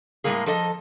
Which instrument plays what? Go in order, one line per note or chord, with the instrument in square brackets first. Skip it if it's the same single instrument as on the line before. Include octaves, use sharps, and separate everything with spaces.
[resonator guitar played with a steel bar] A2 G3 G#3 A#3 G#4
F3 A4 D#5